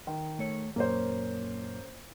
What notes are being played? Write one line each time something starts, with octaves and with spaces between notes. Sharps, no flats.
D#3
A3 C#5
F#2 A#2 A#3 C#4 C5